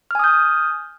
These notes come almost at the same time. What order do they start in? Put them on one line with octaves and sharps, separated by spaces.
F6 G#5 D#6 G6